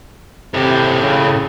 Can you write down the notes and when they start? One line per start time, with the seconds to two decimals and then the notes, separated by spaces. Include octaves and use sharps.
0.53 A2 C3 G4
1.03 C#3